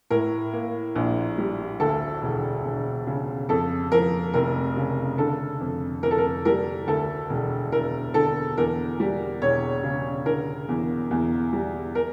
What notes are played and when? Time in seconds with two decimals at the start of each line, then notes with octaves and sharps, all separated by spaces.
0.11 A2 A#4
0.53 A#3
0.95 A#1
1.38 G3
1.80 D2 A4
2.22 E1
2.64 E1
3.07 C#3
3.49 F2 A4
3.92 F3 A#4
4.34 F1 A#4
4.77 C#3
5.18 D3 A4
5.60 F2
6.03 F2 A#4
6.11 A4
6.18 A#4
6.45 G3 A#4
6.87 D2 A4
7.30 E1
7.72 E1 A#4
8.14 D3 A4
8.57 E2 A#4
9.00 G3
9.42 E1 C#5
9.84 C#3
10.26 D3 A#4
10.69 E2
11.11 E2
11.53 G3
11.95 A#4